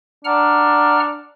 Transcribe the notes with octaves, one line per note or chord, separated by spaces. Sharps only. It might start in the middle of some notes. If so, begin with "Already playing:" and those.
D4 F#5 A#5 F6